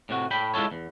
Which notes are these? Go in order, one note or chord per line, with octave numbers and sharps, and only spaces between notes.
A2 C3 F#4
A2 G5 B5
G#3 E4 F4 A4 C#5
E2